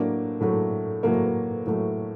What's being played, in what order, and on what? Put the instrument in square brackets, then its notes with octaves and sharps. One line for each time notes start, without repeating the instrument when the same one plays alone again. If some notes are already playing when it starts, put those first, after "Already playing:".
Already playing: [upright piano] A2 F#3 A3 A#3 D4
A2 F#3 A3
A2 F#3 A3 A#3
A2 F#3 A3